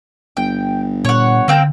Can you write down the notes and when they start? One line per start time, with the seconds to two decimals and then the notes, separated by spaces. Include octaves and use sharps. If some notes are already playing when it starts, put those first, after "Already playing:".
0.37 G1 G5
1.05 A#2 C#5 F#5
1.48 D3 A#3 C4 G5